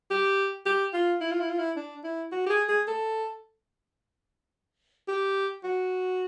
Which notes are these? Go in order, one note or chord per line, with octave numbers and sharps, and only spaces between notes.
G4
G4
F4
E4
F4
E4
F4
E4
D4
E4
F#4
G4
G#4
G#4
A4
G4
F#4